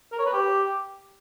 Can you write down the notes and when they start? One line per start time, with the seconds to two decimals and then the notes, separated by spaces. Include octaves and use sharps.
0.12 A#4
0.19 C#5
0.26 B4
0.33 G4